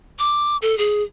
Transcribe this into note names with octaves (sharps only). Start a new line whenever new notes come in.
D6
A4
G#4